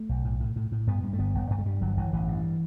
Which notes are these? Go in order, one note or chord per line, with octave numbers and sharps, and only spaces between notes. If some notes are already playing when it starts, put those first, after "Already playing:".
Already playing: A3
B1
A2
A2
A2
A2
G2 B3
G2
A3
G1 B3
G1
G2 B3
A3
G2 G3
G1 F#3
G1 E3
A1 E3
G2